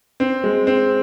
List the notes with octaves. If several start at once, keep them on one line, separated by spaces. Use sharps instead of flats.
C4
G#3
C4